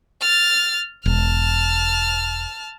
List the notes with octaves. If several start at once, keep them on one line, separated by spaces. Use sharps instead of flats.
F6 A6
E1 A5 F6